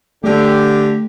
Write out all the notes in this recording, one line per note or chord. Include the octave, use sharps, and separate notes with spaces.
D3 A3 G4